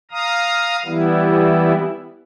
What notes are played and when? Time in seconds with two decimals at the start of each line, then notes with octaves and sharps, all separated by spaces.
0.11 F5 A#5 D#6
0.85 E3 G3 B3 E4